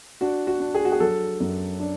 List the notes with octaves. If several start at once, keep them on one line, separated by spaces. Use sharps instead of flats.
D4 F#4
F#4
D4
G#4
F#4
G#4
F#3 A4
F#2
D4